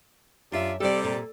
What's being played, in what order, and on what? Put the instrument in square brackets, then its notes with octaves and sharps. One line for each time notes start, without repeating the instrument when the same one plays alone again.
[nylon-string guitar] F#2 E5 [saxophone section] D4 F4 G4
[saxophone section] C3 G3 [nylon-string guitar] A4 D5
[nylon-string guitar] A#2